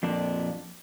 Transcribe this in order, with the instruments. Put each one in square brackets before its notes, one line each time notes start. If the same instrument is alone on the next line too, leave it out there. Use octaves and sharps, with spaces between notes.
[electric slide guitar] F2 A#2 D4